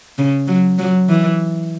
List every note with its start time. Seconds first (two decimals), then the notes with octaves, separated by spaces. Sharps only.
0.18 C#3
0.48 F#3
0.78 F#3
1.09 E3